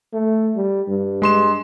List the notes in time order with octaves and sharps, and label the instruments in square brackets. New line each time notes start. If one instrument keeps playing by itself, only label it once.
[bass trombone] A3
G3
G2
[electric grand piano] G#3 C6 E7